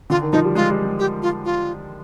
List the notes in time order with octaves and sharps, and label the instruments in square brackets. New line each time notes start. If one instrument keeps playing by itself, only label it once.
[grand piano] D3 [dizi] F4
[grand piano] D#3
[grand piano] F3 [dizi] D#4
[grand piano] G3
[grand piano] G#3 [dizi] F4
[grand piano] G3
G#3
[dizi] G4
F4
F4